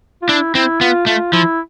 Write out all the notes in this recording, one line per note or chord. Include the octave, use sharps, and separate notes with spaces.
F4
D4 E4
C4 E4
B3 F4
A3 F4
F3 E4